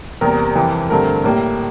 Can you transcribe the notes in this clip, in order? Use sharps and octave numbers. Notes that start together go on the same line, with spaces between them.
E2 C3 G3 A#3 A#4
F2 C3 E3 G3
G2 D3 A3 C4 A#4
A2 G3 A#3